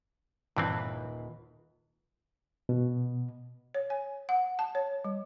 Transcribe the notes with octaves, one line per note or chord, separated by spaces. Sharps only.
D#1 G2 E3 C4 B4
B2
C#5
G#5
F#5
A5
C#5
G3